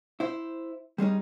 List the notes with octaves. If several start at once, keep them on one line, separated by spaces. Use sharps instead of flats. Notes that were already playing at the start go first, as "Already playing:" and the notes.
E4 C5
G3 G#3 C#4 D#4